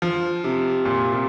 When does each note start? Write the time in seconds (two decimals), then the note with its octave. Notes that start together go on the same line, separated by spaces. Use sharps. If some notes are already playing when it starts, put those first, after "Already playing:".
0.02 F3
0.44 C3
0.85 A#2
1.14 C3